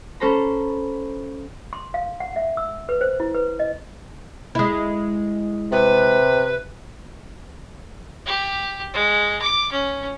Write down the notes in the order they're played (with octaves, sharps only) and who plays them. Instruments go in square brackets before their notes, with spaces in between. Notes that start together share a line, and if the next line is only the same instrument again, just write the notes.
[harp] C#4 A4 C5 A#5 B5
[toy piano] C6
F5
F#5
E5
E6
B4
C5
E4
B4
D#5
[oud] G#3 E4
[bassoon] C3 [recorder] B4
[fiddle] G4
G#3
D6
C#4